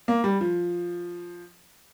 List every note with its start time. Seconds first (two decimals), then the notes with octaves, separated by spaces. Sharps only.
0.08 A#3
0.24 G3
0.41 F3